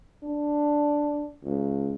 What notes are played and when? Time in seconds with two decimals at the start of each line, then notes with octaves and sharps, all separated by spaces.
0.23 D4
1.43 C#2